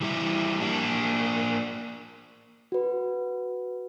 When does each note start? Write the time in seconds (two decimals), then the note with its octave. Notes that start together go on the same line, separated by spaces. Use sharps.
0.01 E3 G3 E4
0.60 A#3 D4
2.72 F#4 B4